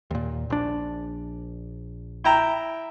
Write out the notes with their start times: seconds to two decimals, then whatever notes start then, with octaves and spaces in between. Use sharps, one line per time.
0.11 D#2 A#2
0.50 A#1 D4
2.24 E4 G5 A#5